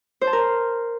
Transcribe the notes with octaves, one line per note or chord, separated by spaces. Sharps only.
C5
A5
A#4